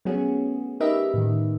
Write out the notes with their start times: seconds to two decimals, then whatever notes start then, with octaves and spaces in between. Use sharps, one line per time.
0.05 F#3 A3 B3 C#4 F#4 G#4
0.80 D#4 G4 A#4 B4 D#5 E5
1.14 A2 D#3